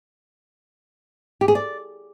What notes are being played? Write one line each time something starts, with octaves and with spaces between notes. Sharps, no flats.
G4
G#4
D5